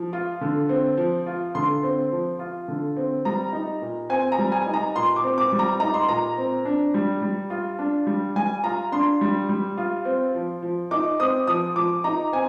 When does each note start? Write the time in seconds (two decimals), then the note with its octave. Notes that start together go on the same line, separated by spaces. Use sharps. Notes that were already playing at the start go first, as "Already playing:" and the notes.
Already playing: F3
0.13 F4
0.41 D3
0.69 C4
0.97 F3
1.26 F4
1.55 D3 C6
1.83 C4
2.11 F3
2.39 F4
2.68 D3
2.97 C4
3.25 G3 A#5
3.53 D#4
3.81 A#2
4.10 C4 G#5
4.32 A#5
4.38 G3
4.52 G#5
4.66 D#4
4.74 A#5
4.95 A#2 C6
5.16 D6
5.23 C4
5.38 D6
5.52 G3
5.59 A#5
5.80 D#4 A#5
5.94 C6
6.08 A#2 A#5
6.37 C4
6.65 D4
6.94 G3
7.21 G3
7.50 F4
7.79 D4
8.07 G3
8.36 G3 G#5
8.63 F4 A#5
8.92 D4 C6
9.21 G3
9.49 G3
9.78 F4
10.05 C4
10.35 F3
10.62 F3
10.91 D#4 D6
11.19 C4 D#6
11.47 F3 D#6
11.76 F3 D6
12.04 D#4 A#5
12.33 C4 G#5